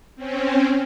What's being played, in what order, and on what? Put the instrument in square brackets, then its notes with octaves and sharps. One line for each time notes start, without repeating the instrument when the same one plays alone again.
[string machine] C4 C#4